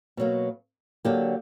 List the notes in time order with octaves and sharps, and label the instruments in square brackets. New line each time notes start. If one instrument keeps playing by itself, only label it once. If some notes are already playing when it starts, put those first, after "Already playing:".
[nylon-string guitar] B2 F#3 A#3
D3 F#3 A#3 D4 G4